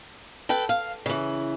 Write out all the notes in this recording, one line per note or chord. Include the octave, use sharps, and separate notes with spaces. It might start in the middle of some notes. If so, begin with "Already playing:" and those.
A4 B4 G5
F5
C#3 E3